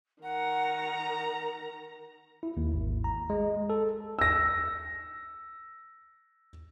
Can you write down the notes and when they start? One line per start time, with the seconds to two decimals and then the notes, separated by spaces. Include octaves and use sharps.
0.23 D#3 F#5 A#5
2.43 E4
2.57 D#2
2.74 G#1
3.04 A#5
3.30 G#3
3.70 A4
4.19 E6 A#6